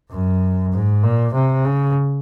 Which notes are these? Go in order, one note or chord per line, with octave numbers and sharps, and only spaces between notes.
F#2
G#2
A#2
C3
C#3